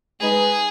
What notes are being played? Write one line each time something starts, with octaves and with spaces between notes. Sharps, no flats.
G#3 D#4 G#4 B4 D#5